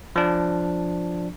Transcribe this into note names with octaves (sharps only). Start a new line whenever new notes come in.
F3 D4